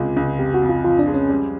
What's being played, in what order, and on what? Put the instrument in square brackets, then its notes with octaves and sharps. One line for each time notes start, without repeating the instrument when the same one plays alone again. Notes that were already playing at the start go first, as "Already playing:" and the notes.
Already playing: [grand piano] C#2 C3 G#3 [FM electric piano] F4
[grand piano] C#2
[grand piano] F2 [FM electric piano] G4
[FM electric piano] F#4
[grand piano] F2
[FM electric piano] F4
[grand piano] F3 [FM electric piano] F4
[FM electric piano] D4
[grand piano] G#3
[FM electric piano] C#4
[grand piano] G3